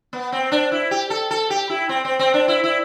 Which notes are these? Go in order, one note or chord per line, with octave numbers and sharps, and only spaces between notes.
B3
C4
D4
E4
G4
A4
A4
G4
E4
C4
C4
C4
D4
E4
E4